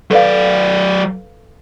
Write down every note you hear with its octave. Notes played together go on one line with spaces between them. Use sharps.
F#3 A4 B4 D5 F5